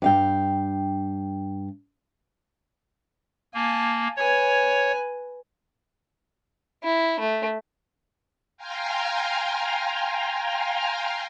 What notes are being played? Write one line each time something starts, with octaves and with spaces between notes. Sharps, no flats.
G2 F5 G5
A#3 G#5 A5
B4 C#5 G#5
E4
A3
F5 G5 G#5 A#5 C6 F6